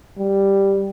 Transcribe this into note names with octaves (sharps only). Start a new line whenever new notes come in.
G3